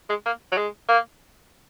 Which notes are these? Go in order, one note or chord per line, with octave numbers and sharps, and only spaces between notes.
G#3
A#3
F#3
G#3
A#3